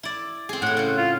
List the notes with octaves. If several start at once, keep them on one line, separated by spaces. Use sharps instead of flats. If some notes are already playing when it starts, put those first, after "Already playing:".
E4 D5
C4 G#4
A2 E4 F#5
C#3 C4
F4